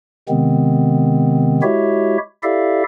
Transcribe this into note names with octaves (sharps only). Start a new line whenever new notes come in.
C3 D#3 G#3 B3 C4
G#3 E4 F#4 G4 C#5 E5
E4 G4 A4 D5 E5 F5